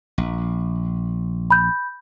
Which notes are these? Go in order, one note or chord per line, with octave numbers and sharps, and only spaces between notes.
A#1
B5 G6